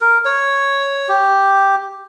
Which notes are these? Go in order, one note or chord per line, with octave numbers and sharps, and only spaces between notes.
A#4
C#5
G4